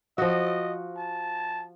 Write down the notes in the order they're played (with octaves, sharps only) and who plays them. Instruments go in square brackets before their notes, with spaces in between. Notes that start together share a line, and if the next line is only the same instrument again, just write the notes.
[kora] F3 F#4 [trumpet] D#5
[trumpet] A5